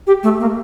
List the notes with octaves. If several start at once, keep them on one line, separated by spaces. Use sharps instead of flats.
G4
A3
A#3